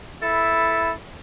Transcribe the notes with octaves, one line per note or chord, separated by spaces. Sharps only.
E4 A4 B4